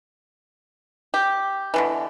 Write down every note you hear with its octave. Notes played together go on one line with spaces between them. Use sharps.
G4
B2 D3 E3